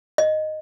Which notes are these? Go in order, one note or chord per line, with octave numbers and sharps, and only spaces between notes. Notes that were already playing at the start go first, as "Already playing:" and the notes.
D#5